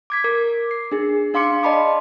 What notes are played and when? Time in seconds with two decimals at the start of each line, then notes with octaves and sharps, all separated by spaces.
0.10 D6 G#6 B6
0.24 A#4 D6
0.71 C7
0.92 D4 G#4
1.34 D4 F5 C6 D6 C#7
1.63 D5 D#5 A5 B5 C6 D6